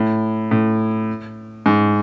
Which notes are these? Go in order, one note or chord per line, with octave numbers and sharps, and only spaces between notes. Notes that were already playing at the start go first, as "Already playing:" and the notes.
Already playing: A2
A2
G#2